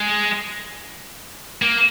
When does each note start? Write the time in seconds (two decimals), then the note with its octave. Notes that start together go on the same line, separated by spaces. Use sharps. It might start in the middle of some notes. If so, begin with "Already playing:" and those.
Already playing: G#3
1.62 A#3